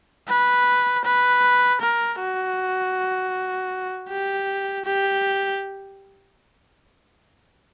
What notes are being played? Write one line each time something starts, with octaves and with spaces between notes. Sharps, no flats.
B4
B4
A#4
F#4
G4
G4